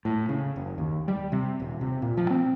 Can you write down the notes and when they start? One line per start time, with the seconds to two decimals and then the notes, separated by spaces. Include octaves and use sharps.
0.05 A2
0.29 C#3
0.56 F#1
0.78 D#2
1.08 G3
1.32 C3
1.60 D#1
1.81 C3
2.02 A#2
2.17 F3
2.30 C4